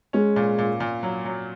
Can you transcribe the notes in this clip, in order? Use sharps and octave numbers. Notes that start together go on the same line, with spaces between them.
G#3 C#4
A#2
A#2
A#2
F#3
F#3